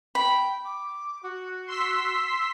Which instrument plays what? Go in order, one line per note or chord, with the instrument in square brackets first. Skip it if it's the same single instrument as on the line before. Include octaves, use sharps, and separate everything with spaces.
[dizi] G5 [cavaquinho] B5
[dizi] D6
F#4
[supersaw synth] C6 E6 B6